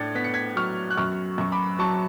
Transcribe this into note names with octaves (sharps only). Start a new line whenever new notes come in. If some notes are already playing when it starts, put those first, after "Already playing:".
Already playing: A2 D4 G#6 A6 C#7
B3 B6
C#7
G#6 B6
F#3 C#6 F6
F#6
F#2 C#6 F6
F#2 C#6
B5 D6
F#3 A5 C#6